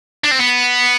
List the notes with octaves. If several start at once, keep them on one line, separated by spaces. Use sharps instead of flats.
D4
C4
B3